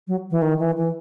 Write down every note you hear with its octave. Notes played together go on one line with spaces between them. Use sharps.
F#3
E3
D#3
E3
E3